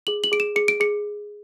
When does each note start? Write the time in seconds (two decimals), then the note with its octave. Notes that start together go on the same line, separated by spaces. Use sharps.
0.07 G#4 F#7
0.24 F#7
0.32 G#4 D7
0.40 E7
0.56 G#4 C#7
0.68 D7
0.80 G#4 C#7